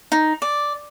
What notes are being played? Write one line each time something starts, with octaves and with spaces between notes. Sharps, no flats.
D#4
D5